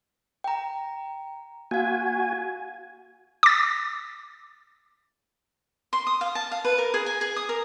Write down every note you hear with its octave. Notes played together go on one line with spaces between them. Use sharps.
G5 A#5
A#3 F#4 F5 G#5
D6 A6
C6
D#6
F5
A5
F5
B4
A#4
G#4
G#5
G#4
D#6
A#4